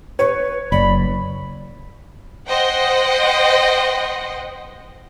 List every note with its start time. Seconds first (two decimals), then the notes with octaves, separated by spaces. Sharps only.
0.19 B4 C#5
0.72 F#1 D5 B5
2.47 C5 D#5 F#5 G5 C6